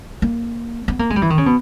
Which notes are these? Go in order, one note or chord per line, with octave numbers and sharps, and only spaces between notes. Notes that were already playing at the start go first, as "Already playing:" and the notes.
A#3
B3
A#3
G#3
G3
E3
D#3
C#3
B2